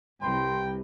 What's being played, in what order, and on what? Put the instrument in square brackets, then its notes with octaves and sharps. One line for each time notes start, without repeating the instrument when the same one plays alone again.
[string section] C2 [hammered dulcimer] G3 B4 A#5 [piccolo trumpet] G5 [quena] C6